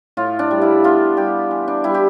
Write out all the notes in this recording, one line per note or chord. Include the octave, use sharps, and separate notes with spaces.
A2 F4
D4
G3
E4
B3 F4
G3 G4
E3
D4
G3 E4
G4